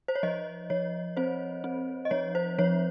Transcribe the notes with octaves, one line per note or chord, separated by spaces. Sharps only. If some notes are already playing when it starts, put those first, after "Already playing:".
C5
C#5
F3 D#5
F3 C#5
C4 C5
C4
D#5
F3 C#5
C5
F3 C#5